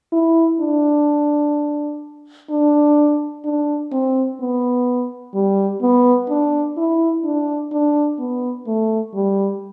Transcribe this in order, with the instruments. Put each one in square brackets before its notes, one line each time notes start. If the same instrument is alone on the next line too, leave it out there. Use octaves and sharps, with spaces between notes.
[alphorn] E4
D4
D4
D4
C4
B3
G3
B3
D4
E4
D4
D4
B3
A3
G3